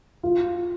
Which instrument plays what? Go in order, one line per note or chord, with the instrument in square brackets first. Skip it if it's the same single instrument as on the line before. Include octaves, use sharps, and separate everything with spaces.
[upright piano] F4